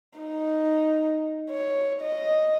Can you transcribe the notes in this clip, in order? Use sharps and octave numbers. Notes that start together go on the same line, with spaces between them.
D#4
C#5
D#5